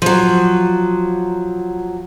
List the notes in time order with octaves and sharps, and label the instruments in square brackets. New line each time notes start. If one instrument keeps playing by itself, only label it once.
[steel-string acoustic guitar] F3 F#3